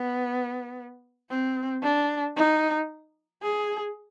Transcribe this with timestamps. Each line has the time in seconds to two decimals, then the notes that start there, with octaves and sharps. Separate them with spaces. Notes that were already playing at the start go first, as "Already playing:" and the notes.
Already playing: B3
1.30 C4
1.83 D4
2.36 D#4
3.42 G#4